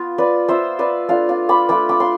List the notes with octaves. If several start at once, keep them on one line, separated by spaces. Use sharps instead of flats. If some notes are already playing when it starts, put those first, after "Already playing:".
Already playing: B3 F4
B4 D5
B3 F4 C5 E5
B4 D5
A3 D4 F4 D5 F5
D5 F5
B5 D6
A3 D4 F4 B5 D6
B5 D6
C6